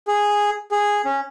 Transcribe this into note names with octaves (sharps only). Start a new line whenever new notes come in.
G#4
G#4
C#4